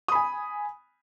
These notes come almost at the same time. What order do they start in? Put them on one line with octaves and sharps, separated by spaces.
D#6 B5 G#5